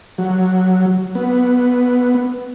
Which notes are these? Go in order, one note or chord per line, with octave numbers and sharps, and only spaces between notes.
F#3
B3